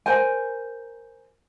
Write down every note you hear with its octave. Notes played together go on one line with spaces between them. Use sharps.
A#4 C5 G#5